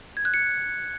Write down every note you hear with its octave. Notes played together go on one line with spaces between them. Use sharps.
G#6
F#6
C#7